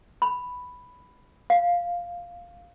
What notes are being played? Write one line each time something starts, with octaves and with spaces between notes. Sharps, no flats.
B5
F5